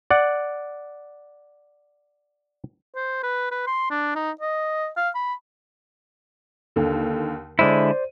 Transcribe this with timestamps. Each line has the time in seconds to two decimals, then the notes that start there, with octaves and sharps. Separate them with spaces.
0.11 D5 F#5
2.96 C5
3.23 B4
3.52 B4
3.67 C6
3.91 D4
4.15 D#4
4.41 D#5
4.97 F5
5.15 B5
6.76 D#2 D3
7.59 D3 G#3 E4 C5 D5 D#7